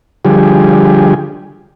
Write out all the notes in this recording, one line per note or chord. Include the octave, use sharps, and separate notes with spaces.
D3 F3 G3 G4 G#4